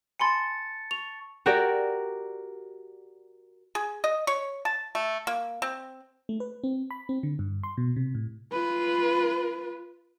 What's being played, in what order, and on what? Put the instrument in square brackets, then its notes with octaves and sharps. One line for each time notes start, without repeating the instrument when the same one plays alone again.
[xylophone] G#5 B5 C6 [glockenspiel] A5 A6 C#7
[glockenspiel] C#6 [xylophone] F7
[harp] F#4 G4 A#4 D5
[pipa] G#4
D#5
C#5
A5
A3
A#3
C4
[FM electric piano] A3
B4
C4
B5
C4
D3
G2
C6
B2
C3
A2
[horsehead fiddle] F4 B4